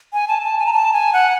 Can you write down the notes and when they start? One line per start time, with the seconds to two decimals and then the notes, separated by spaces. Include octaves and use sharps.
0.13 G#5
0.28 A5
0.42 A5
0.58 G#5
0.66 A#5
0.73 A5
0.93 G#5
1.13 F#5